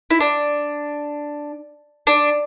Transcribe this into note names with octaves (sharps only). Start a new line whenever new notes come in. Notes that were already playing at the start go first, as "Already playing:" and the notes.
E4
D4
D4